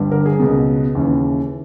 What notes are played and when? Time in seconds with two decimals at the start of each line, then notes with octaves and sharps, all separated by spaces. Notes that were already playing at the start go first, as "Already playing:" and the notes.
Already playing: G1 G2 D3
0.11 A#4
0.26 G#4
0.40 C#2 B2
0.95 D#2 C#3 E3